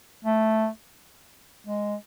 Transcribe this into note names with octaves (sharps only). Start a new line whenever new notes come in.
A3
G#3